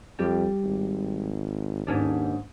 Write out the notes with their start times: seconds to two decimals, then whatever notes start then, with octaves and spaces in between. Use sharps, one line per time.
0.19 F2 G3 G4
0.64 G#1
1.87 D#2 G#2 C#4 D4